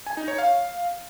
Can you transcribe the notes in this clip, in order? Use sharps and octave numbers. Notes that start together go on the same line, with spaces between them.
G#5
D#4
C#5
F5